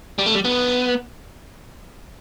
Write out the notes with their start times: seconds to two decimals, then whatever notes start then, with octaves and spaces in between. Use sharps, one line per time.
0.19 G3
0.26 A3
0.34 G3
0.45 B3